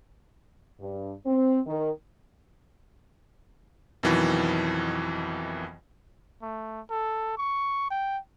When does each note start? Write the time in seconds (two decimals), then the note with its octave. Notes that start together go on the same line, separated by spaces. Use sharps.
0.80 G2
1.26 C4
1.67 D#3
4.03 F2 B2 D#3 E3 F#3
6.42 A3
6.90 A4
7.37 C#6
7.90 G5